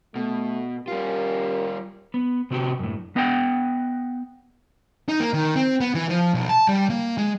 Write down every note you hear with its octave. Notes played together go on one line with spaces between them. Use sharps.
B2 A3
G3 C#4 F4 G4 A#4
B3
C3 C4 F#4 G4 G5
F#2 A2
B3 D#5 F#5 G5
D#4
A#3
D#3
C4
B3
E3
F3
B1
A5
G3
A#3
G#3